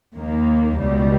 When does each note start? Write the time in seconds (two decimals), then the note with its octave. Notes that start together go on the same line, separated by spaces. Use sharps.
0.17 D#2 D#3 A#3
0.78 C#2 B2 G3